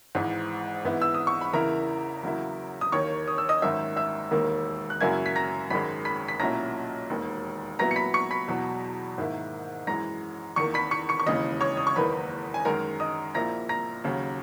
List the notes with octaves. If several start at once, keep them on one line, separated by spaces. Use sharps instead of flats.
G#1 G#2 E3
G#2 E3 B3 E4
E6
D#6
C#6
B5
E2 C#3 E3 A#3 E4 A#4 A#5
E2 C#3 F#3 A#3 E4
D#6
D#2 D#3 A#3 C#5 C#6
D#6
E6
D#5 D#6
G#1 F#2 D#3 E5 E6
E5 E6
E1 D#2 D#3 A#3
F#6
F#2 C#3 F#3 A#3 E4 G#5 G#6
B6
A#5 A#6
G#1 F#2 D#3 G#3 B5 B6
B5 B6
B6
B1 A#2 F#3 C#4 E4 A#5 A#6
E1 D#2 D#3
A#2 F#3 B3 E4 A#5 A#6
C#7
B5 B6
C#6 C#7
B5 B6
E2 B2 F#3
G#2 D#3 A#3 E4
F#2 E3 G#3 A#5 A#6
E2 D#3 A#3 C#6 C#7
B5 B6
C#6 C#7
C#6 C#7
C#6
E1 D#2 C#3 E3 D#5 D#6
C#5 C#6
D#6
C#6
F#1 E2 D#3 A#3 D#4 B4 B5
G#5
F#2 D#3 G#3 A#4 A#5
D#5 D#6
A#1 A#2 A#3 E4 A#5 A#6
A#5 A#6
D#2 C#3 F#3